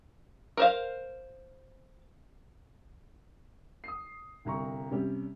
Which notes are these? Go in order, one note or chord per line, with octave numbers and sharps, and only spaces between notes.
A#4 C5 F5
D#6 C7
G1 C2 A#5 C#6
C3 G3 C#4 G4